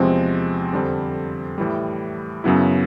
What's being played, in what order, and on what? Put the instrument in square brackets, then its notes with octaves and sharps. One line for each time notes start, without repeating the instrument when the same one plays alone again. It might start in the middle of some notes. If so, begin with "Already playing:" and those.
Already playing: [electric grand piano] E2 C3 F3 G#3 C4
F2 D3 G3 C4
A2 E3 G3
F#2 C#3 F#3 B3 E4